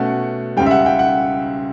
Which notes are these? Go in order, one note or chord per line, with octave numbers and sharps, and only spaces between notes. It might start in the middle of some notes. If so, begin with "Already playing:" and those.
Already playing: B2 A3 C#4 F#5
C#2 C#3 G3 G5
E5
F#5
G5
F#5